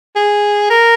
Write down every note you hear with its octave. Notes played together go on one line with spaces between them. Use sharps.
G#4
A#4